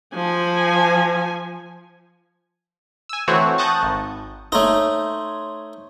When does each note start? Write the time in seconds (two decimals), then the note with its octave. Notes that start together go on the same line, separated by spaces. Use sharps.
0.14 F3 G#5
3.09 G#5 E6
3.28 E3 A3 C4 F#4 C#5
3.58 A5 C#6 D#6 F#6 G6 A#6
3.82 G#1
4.52 A3 D#4 C5 C#5